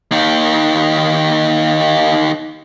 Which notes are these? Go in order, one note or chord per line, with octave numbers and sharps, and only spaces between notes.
D#2 D#3